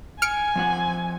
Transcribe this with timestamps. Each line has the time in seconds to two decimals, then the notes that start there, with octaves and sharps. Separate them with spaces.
0.22 G#5 F6 C#7 D7
0.56 F3 C4 F#5